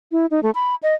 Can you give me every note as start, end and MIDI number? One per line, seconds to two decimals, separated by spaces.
0.12 0.26 64
0.31 0.40 63
0.43 0.51 57
0.55 0.75 83
0.83 0.95 75